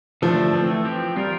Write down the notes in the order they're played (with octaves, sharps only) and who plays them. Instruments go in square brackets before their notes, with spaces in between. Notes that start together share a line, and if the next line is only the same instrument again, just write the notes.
[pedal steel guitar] D3 A3 D4 [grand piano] F3
[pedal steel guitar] E3 A3 C4
F3 C4 G4
[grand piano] G3 [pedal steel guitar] C4 F4 A#4